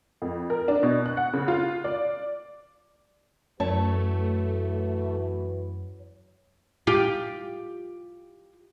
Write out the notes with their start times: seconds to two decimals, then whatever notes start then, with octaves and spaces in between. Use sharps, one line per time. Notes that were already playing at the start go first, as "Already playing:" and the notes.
0.22 F2
0.50 A#4
0.68 D4
0.83 B2
1.06 F#6
1.17 F#5
1.34 C#3
1.48 F4
1.84 D5
3.60 F#2 E3 A3 F#4 B4 C#5 A5
6.87 F4 G4